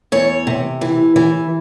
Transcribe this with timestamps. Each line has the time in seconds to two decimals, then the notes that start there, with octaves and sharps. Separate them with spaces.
0.12 E2 C#5
0.47 C3
0.81 E3
1.16 E3